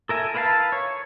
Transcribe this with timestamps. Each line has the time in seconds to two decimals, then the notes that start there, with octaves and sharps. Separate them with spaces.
0.09 A4 A#4 E5 G#5
0.35 E4 A#4 B4 F5 A5
0.72 C#5